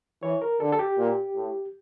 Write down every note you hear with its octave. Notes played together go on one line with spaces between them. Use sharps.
E3 C#5
A#4
D3 A4
A4
G4
A#2
A2